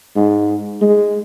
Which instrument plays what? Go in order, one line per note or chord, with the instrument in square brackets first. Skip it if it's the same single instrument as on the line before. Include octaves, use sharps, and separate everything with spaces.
[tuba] G#2
G#3